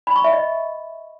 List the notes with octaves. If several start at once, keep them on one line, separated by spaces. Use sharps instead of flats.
B5
C#6
E5
D#5